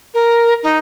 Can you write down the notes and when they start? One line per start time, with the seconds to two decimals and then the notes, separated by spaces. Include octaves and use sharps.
0.14 A#4
0.63 D#4